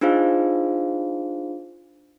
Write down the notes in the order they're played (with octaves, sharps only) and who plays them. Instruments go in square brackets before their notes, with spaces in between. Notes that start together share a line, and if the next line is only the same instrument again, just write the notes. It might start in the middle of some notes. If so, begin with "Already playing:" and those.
[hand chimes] D4 D#4 F4 G#4 C5 F5